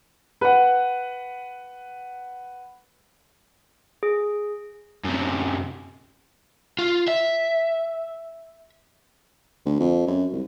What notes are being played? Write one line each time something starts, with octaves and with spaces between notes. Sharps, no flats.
B4 F#5
G#4
F#2 C3
F4
E5
D2
F2
F#2
C2